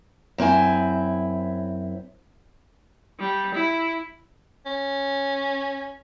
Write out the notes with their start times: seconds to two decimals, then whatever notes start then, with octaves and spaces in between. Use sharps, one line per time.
0.38 F#2 C4 E4 G#5
3.20 G3
3.55 E4
4.66 C#4